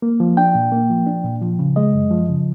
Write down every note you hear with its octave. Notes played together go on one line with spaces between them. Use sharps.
A#3
F3
D4 G5
A#2
A#3
F3
D4
A#2
F3
C#3
G#3 D#5
F#2
F3
C#3